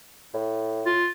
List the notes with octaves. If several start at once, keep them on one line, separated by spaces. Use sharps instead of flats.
A2
F4